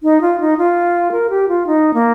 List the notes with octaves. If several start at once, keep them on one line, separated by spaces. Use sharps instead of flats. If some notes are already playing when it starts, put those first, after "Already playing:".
D#4
F4
D#4
F4
A#4
G4
F4
D#4
A#3